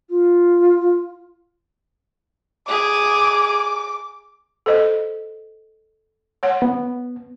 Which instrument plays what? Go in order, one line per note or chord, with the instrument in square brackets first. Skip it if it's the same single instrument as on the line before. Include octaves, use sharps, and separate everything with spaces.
[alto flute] F4
[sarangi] G#4 [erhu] D6
[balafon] A4 C5 D#5
C#5 F#5
[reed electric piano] B3